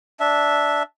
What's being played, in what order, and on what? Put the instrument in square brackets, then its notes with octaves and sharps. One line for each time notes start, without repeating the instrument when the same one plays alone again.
[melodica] D4 E5